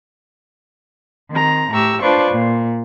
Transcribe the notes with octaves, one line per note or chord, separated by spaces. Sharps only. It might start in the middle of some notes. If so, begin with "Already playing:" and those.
D#3 C4 A#5
A2 G4 A#5 C#6 E6
D4 F4 B4 C5 D5 C#6
A#2